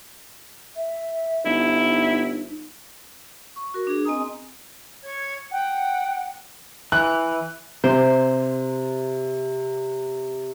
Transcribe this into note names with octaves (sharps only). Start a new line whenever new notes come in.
E5
G1 D#4 E4
C#6
F#4 A#4
D4 G#4
C4 D#5 G#5 A#5 D#6
C#5 G#6
F#5 G5
E3 F#6
C3 C5